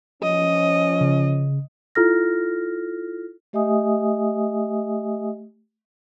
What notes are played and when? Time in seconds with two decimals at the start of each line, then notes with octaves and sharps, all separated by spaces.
0.23 F3 C#4 D#5
1.01 C#3
1.95 E4 F4 A4 F6 A#6
3.53 A3 G4 D#5 E5 G#5 D#6